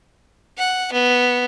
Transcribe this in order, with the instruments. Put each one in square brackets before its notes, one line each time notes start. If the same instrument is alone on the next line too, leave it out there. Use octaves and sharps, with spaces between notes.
[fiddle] F#5
B3